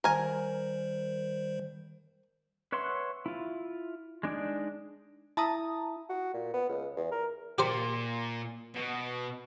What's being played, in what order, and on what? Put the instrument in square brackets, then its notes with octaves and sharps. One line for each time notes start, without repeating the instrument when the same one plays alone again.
[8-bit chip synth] D#3 G3 C5 [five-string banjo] A#4 G#5
[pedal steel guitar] B4 C#5 E5 F#5 C6
E4 F4
G#3 D4 D#4 D5
[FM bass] E4 [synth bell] A5 A#5 D#6
[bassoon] F#4
A#2
B3
C#2
E2
A#4
[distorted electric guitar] A#2 [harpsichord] G4 A#4 C5
[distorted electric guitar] B2